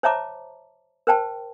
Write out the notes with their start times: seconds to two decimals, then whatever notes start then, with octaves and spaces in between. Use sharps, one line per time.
0.03 C5 C#5 E5 A5 A#5 D6
1.07 A#4 C5 G5 A5